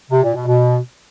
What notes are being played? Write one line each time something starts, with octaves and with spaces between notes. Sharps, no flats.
C3
A#2
B2
B2